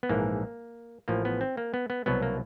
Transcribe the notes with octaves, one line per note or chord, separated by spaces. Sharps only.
B3
A#1 G#2 E3 A#3
A1 A2 F3 A#3
B3
C4
A#3
B3
B3
C2 B2 F#3 B3
A#3